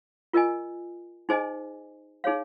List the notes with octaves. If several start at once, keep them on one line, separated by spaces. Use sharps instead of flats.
F4 A#4 D#5 G#5
D#4 G#4 C5 D#5 G#5
D#4 G#4 C#5 F5